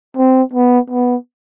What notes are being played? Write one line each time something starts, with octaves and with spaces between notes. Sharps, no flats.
C4
B3
B3